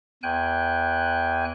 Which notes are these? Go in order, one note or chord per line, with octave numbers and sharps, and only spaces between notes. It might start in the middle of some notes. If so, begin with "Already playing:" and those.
E2 G5 G#5 F#6